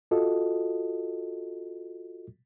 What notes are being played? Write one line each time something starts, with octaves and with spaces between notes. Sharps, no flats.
F4 F#4 A4 D#5